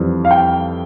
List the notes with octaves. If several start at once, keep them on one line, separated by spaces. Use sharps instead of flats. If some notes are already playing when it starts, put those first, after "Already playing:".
Already playing: F2 E3 G3
F5
G5